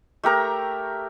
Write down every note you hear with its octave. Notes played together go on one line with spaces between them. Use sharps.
A3 G4 A#4 A#5